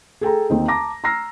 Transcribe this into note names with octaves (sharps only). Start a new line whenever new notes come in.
G#4 A4 G5 A#5
D#2 C4 D#4
A5 A#5 D6 A#6
A#5 E6 F6 A#6 C7